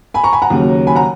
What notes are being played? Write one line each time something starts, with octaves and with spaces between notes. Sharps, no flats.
G#5 B5
A#5 C#6
G#5 B5
F#5 A#5
D#2 C#3 F#3
G#5 B5
F#5 A#5